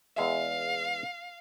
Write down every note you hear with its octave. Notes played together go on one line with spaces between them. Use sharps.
E2 G#3 E5 F5